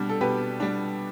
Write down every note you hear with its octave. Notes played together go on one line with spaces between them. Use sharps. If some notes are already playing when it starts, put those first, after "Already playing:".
Already playing: B2 G3 D4
A4
B2 G4 B4
G3 D4